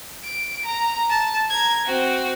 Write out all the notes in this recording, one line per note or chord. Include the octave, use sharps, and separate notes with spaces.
D7
A#5
A5
A#5 G#6
C4 F#4